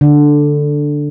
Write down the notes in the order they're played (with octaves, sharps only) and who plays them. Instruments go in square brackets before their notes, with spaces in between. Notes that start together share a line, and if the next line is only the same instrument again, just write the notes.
[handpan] D3